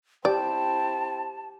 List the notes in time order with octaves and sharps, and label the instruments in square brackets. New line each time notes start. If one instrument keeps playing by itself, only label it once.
[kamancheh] C4 E4 [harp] G4 [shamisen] D5 [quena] A5